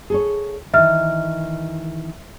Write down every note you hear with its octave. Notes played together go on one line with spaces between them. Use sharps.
G#4 A4 C#5
D#3 E3 E5 F6